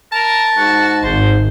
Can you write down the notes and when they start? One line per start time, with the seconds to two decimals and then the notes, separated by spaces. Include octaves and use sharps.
0.12 A#4 A5
0.57 G#2 F#4
1.03 G#1 C5